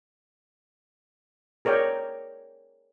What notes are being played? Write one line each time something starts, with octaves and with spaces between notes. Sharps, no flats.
G#4 A#4 C#5 D5 G5